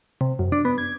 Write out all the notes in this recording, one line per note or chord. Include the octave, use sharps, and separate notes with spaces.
C3
F#2
D4
B3
G#6